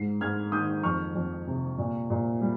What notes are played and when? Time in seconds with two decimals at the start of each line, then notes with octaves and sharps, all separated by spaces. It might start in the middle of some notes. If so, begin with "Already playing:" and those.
Already playing: G#2 C7
0.21 G#2 F6 G#6
0.52 D#3 D#6 G6
0.83 F2 C#6 F6
1.15 F2
1.47 C3
1.78 A#2
2.10 A#2
2.41 G3